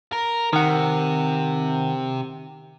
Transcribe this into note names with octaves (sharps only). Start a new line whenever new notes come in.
A#4
C3 D#3 F#5